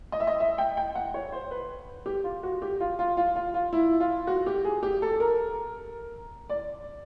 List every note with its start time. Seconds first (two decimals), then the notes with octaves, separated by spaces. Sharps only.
0.12 D#5
0.20 E5
0.27 D#5
0.40 E5
0.58 G5
0.77 G5
0.95 F#5
1.14 C#5
1.32 C5
1.51 B4
2.06 G4
2.24 F4
2.43 F#4
2.62 G4
2.81 F4
2.99 F4
3.17 F4
3.36 F4
3.54 F4
3.73 E4
4.00 F4
4.27 F#4
4.46 G4
4.64 G#4
4.83 G4
5.02 A4
5.20 A#4
6.49 D5